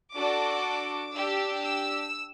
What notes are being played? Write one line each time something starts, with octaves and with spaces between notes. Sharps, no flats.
D4 F#4 A4 D6
D4 G4 E6
E6